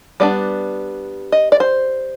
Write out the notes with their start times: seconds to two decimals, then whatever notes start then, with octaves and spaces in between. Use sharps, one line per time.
0.20 G3 B3 D4 D5
1.32 D#5
1.52 D5
1.60 C5